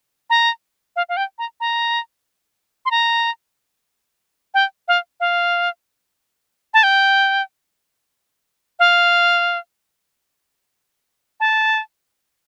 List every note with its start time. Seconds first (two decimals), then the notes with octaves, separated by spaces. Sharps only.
0.30 A#5
0.96 F5
1.09 F5
1.17 G5
1.39 A#5
1.60 A#5
2.85 C6
2.91 A#5
4.54 G5
4.88 F5
5.20 F5
6.74 A5
6.83 G5
8.79 F5
11.40 A5